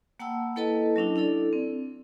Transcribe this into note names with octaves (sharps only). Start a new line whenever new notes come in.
A#3 F#5 G5 A5 B5 E6
A#3 E4 A4 B4 D#5 A5
F#3 C#4 D4 E4
D4 E4 A4 D5
C4